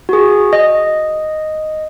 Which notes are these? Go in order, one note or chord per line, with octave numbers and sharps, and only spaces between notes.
F#4 G#4
D#5